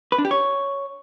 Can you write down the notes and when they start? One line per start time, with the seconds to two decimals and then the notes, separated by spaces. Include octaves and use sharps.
0.12 B4
0.18 D4
0.25 G4
0.31 C#5